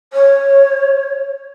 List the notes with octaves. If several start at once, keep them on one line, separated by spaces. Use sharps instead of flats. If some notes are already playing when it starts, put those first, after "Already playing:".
C#5